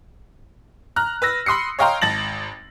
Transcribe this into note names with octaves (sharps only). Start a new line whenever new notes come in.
A#5 F6 F#6
B4 E6 A#6
B5 C6 D#6 C7 C#7
C#5 D#5 F5 G5 A#5 C6
G#1 A5 A6 A#6 F#7